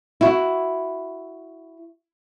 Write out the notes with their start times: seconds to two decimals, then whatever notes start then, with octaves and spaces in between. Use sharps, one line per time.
0.21 E4 F#4